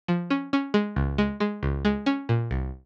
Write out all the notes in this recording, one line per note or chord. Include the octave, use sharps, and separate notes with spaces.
F3
C#4
C#4
G#3
C#2
G#3
G#3
C#2
G#3
C#4
A#2
C2